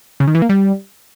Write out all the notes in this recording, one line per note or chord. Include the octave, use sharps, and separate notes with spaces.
C#3
D#3
E3
A#3
G3